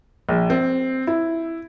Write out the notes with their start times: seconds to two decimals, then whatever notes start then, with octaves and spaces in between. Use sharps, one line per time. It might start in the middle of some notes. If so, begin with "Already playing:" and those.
0.29 A#1
0.50 C4
1.07 E4